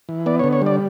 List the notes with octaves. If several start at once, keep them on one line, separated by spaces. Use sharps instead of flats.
E3
B3 D5
C#5
D3
C#5
G3 D5